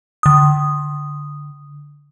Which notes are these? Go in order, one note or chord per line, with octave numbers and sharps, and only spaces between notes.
D3 D#6